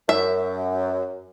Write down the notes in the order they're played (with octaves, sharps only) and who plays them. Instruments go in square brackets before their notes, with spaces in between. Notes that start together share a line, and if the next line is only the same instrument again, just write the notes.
[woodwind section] F#2 [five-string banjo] E5